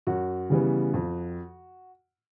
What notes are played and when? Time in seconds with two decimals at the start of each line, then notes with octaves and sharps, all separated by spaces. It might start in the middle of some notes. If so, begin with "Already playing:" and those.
0.07 F#2 F#4
0.50 C#3 E3 G3 B3
0.94 F2